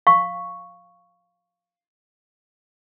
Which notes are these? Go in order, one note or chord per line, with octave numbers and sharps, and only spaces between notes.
F5 C#6